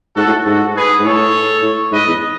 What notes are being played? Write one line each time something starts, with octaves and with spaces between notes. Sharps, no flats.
G#2 F#4 A4
A2
G#2 F#4 A4
G#4 B4
G#2
A2 A4 C#5
A2
G#2 B4 D#5
E2